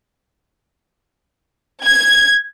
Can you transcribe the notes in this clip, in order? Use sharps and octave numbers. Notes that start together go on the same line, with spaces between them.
G#6